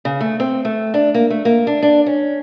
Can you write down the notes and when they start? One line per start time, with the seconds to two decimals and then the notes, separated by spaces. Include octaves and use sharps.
0.05 C#3
0.21 A3
0.40 C4
0.65 A3
0.94 D4
1.15 A#3
1.30 A3
1.45 A#3
1.67 D4
1.83 D4
2.07 C#4